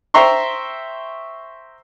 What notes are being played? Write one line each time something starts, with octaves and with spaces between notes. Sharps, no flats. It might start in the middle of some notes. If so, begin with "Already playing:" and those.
C5 E5 G5 A#5 C6 C#6